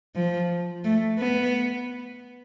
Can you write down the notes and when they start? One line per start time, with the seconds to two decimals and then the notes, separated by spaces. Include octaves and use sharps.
0.16 F3
0.84 A3
1.19 B3